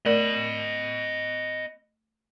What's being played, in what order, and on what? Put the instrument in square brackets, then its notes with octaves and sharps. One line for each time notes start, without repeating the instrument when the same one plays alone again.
[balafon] A3 A#4 D5 [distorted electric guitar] D#5 B5